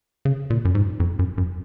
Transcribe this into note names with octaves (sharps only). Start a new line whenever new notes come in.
C#3
A#2
F#2
G#2
F2
F#2
F#2